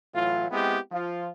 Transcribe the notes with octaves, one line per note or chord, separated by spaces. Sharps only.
A2 E3 F#3 F4
G#3 B3 C4 E4 G4
F3 F4